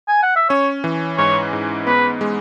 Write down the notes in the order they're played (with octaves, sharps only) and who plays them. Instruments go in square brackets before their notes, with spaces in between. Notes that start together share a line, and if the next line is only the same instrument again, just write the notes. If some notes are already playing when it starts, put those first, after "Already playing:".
[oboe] G#5
F#5
E5
[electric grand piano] C#4 [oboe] C#5
[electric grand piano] E3
[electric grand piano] G#2 [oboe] C#5
[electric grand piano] G#2
[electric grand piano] B3 [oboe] B4
[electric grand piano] G#3